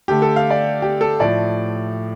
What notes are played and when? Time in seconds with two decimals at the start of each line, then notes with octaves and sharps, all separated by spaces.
0.08 D3 A3 G4
0.22 A4
0.36 F5
0.51 D5
0.82 G4
1.01 A4
1.20 A2 F3 A3 D5